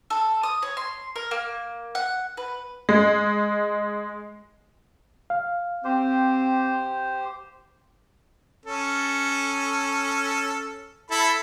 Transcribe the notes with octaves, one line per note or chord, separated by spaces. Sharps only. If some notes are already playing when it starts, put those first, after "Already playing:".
A4
D#6
C#5
C6
A#4
A#3
F#5
B4
G#3
F5
C4 G4 C5
C#4 A4
E4 A4 B5